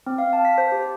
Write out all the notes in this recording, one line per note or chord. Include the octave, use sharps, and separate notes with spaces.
C4
F5
A5
B6
C5
G4